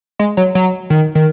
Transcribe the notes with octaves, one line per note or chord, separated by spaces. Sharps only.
G#3
F#3
F#3
D#3
D#3